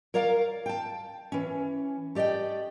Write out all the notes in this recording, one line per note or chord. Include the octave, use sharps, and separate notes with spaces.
A#4 C#5 D5 F5 A#5
G5 A5
E3 C#4
A3 G4 D5 D#5 G5